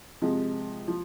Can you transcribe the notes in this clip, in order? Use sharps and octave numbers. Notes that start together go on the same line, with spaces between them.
C3 F3 G#3
F3